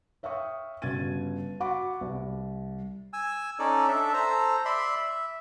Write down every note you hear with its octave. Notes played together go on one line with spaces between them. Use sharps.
C#5 E5 F5 G5 C#6 D#6
G1 C#3 F#4 G#6 A6 D#7
F#4 F#5 B5 C#6 D6
C2
G#5 E6
C#4 D#4 A4 D5
D4 A4 E5
A4 C5 A#5
D5 E5 B5 C6
E5